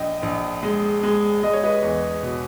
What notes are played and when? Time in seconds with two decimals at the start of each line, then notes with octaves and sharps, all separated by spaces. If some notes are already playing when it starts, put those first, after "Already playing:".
Already playing: A#1 D#5 G5
0.23 A#1
0.63 G#3
1.03 G#3
1.43 G#3 D#5
1.53 C#5
1.64 B4 D#5
1.83 E2
2.23 B2